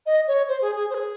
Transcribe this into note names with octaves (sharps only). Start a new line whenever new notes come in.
D#5
C#5
C5
G#4
G#4
C5
G#4